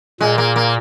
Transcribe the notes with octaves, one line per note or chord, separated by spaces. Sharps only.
A#2 G#3
A#3
A#3